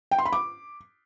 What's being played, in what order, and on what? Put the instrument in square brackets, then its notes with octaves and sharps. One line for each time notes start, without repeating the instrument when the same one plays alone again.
[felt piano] G5
C6
B5
D6